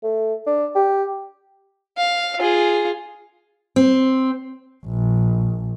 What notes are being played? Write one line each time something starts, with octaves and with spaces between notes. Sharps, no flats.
A3
D4
G4
F5
F4 G#4
C4
A#1